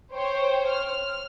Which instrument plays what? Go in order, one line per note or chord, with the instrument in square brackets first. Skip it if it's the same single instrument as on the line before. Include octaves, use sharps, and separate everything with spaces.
[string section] C5 C#5 G5
F6